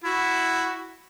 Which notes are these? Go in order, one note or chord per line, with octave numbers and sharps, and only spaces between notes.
E4 F#4